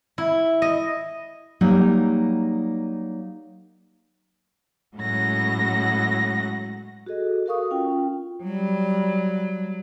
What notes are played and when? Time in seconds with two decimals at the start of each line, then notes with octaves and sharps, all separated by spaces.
0.18 E4
0.62 D#5
1.61 F#3 G3 A#3 D#4
4.96 A2 F#3 G#3 C#4 F#5 A#6
7.06 F#4 G#4 A4 D#5
7.46 F#4 A4 A#4 F5 C#6 D#6
7.71 C#4 F4 G5
8.44 F#3 G3